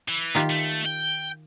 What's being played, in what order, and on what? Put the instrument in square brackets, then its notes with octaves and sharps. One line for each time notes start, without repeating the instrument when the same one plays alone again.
[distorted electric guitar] E3
[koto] D#3 F4 G4
[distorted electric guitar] A3
G5